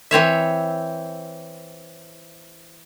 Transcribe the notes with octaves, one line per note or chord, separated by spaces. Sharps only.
E3 C4 C#5 E5